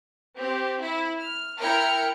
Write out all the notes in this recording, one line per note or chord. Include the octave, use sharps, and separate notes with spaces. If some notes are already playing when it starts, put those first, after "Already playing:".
C4 G4
E4
F6
E4 A#4 G5 F6 C#7